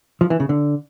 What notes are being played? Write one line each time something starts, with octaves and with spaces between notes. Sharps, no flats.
F3
E3
C#3
D3